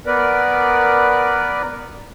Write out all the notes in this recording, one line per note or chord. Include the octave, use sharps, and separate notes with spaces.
B3 A#4 B4 D5